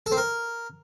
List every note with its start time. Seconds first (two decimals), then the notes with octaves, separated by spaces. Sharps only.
0.06 A4
0.12 C4
0.17 A#4